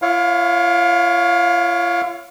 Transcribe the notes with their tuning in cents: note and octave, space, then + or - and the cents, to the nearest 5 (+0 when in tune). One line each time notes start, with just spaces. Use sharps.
F4 -45 C#5 +0 F5 +25